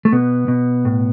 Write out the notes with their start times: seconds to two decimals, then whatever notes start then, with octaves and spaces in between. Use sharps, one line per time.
0.05 A3
0.12 B2 B3
0.48 B2
0.85 A2